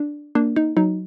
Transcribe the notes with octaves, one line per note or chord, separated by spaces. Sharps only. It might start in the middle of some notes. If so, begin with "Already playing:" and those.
Already playing: D4
A#3 D4
D#4
F#3 D#4